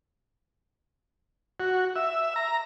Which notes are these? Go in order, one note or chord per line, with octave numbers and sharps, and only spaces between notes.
F#4
E5
A#5